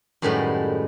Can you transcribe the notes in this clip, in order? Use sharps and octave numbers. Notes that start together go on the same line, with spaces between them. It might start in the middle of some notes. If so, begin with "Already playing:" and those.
F#2 A2 D#3 G3 G#3 B4